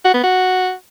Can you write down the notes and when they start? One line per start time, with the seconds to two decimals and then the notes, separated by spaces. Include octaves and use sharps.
0.05 F#4
0.14 B3
0.24 F#4